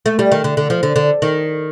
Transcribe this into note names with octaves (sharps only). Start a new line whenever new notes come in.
A3
G3
D#3
D3
D3
F3
D3
D3
D#3